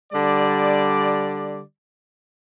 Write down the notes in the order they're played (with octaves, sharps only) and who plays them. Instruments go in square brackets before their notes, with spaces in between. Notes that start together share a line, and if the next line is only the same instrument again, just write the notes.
[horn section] D3 G3 D5